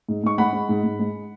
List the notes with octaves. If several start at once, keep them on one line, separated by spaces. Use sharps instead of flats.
G#2
G#2 C#6
G#3 F#5 B5
G#3
G#2
G#2
G#3